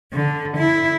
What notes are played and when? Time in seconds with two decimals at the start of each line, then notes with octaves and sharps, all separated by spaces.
0.12 D3
0.58 E4